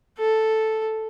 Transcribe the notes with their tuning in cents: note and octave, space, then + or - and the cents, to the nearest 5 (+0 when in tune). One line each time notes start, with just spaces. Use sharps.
A4 +0